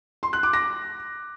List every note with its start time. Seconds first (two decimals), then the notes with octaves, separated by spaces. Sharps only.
0.23 C6
0.33 F#6
0.43 D6
0.53 A#6